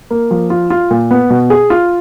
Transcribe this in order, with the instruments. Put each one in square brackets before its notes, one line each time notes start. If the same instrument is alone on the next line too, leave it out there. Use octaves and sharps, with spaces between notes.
[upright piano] A#3
F3
F4
F4
A#2
B3
B2
G#4
F4